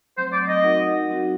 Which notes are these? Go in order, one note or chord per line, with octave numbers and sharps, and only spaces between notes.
F#3 A3 C4 C5
D5
D#5
D#4 F#4 A#4 F#5
F#3 C4 D#4 F#4